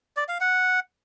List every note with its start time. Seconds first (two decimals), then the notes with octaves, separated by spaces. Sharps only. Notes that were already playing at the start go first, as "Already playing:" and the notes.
0.17 D5
0.29 F5
0.40 F#5